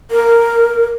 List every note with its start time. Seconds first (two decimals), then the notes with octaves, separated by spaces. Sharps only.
0.11 A#4